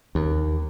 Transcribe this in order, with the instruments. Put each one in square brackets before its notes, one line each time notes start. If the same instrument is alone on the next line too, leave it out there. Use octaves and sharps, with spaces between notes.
[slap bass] D#2